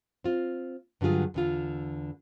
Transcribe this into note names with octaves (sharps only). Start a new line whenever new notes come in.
C4 F4
G2 D3 F#3 F4 G#4
E2 D3 F4